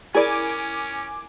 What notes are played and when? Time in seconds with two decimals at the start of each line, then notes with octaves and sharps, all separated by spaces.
0.15 C#4 E4 G#4 A#4 D5 G#5 B5 D6